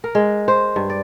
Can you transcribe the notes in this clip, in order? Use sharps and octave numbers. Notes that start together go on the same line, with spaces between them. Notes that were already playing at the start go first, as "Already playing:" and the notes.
A#4
G#3
C5
G2
D5